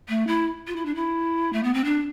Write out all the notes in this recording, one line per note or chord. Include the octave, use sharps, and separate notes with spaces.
A3
E4
F4
E4
D4
E4
A3
B3
C4
D4